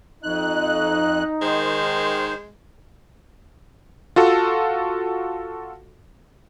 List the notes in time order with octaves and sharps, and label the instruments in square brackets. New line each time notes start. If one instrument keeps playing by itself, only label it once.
[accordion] F2 F#6 [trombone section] D#4
[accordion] D#3 C5 [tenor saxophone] G#3
[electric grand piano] F4 F#4 A4